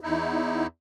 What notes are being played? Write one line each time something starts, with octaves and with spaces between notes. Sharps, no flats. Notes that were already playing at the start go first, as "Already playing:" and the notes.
E2 D#4 E4